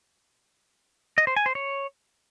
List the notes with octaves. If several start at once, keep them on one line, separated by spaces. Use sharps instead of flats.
D#5
C5
G#5
C5
C#5